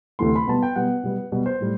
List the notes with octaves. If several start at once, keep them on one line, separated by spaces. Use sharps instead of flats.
D2 C3 E3 A3 C6
B5
B2 G3 B3 A5
G5
B2 G3 B3 F#5
B2 G3 B3
B2 G3 B3
C5
A2 G3